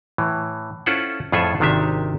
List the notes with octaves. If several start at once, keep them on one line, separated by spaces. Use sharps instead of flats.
A2 E3
C#4 E4 F4 A4 C5 F#5
F2 A2 F4 G#4 A4 E5
G#1 C3 D#3 D4 G4 E5